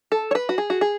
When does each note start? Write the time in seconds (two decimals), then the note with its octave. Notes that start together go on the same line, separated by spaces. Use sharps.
0.12 A4
0.31 C#5
0.35 B4
0.49 F#4
0.58 G#4
0.70 F#4
0.81 G#4